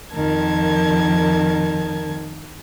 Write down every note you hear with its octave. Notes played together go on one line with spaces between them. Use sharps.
F2 D#3 F3 A#4 A5 G#6